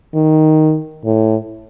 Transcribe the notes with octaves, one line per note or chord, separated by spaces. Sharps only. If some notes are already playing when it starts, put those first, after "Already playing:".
D#3
A2